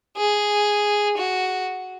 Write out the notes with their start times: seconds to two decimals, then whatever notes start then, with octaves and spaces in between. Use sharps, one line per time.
0.17 G#4
1.18 F#4